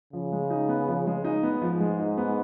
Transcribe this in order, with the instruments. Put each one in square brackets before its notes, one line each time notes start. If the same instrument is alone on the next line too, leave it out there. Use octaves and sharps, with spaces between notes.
[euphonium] C#3 [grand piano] F3
[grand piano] G#3
D#4
B3
F3
G#3
D#4
B3
[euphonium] G#2 [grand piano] F3
[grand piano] G#3
D#4
B3